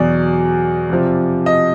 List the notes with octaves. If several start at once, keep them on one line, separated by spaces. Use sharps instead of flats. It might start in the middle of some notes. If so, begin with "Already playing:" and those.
Already playing: E2 B2 F#3 D5
F2 C3 F3
D#5